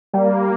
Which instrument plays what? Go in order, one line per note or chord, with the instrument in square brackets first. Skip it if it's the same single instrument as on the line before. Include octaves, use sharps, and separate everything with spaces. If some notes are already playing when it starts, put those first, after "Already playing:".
[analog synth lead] G3 [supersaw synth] A#3